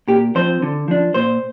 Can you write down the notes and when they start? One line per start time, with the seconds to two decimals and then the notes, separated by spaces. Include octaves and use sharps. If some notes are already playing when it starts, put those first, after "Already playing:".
0.08 A#2 G4
0.35 F3 C4 C5
0.62 D3
0.88 F3 D4
1.14 A#2 C5